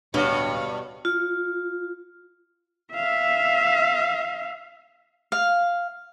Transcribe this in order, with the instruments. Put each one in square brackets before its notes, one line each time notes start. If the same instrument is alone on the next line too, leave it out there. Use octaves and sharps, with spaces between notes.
[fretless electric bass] D1 D4 [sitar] G2 [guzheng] B2 [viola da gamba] C#5
[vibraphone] F4
[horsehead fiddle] E5 F5
[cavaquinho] F5